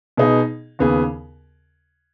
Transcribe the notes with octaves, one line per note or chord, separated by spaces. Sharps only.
B2 B3 D#4 G#4
D#2 C#3 B3 G#4